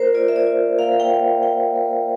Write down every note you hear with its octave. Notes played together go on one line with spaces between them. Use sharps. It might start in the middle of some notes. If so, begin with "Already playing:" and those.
Already playing: A#3 F4 A#4 C5
F4 D5
E5
D5
F4
A#3 F5
G5
A#3
F4 G5
A#3